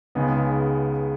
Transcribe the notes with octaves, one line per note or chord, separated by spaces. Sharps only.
C#2 C#3 G#3 B3 D#4